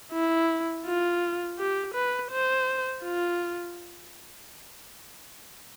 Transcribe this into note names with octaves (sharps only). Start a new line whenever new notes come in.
E4
F4
G4
B4
C5
F4